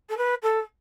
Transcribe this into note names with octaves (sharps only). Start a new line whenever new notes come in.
A4
B4
A4